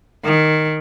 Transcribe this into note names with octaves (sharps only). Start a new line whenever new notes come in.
D#3